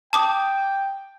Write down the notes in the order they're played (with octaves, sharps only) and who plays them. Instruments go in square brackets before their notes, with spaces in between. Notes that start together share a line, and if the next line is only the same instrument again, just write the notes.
[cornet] G5 [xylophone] A5 D6 D#6